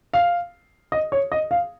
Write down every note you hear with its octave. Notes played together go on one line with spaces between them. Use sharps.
F5
D#5
C#5
D#5
F5